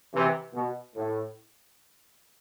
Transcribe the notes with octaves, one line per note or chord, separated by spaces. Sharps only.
C3 E3
B2
A2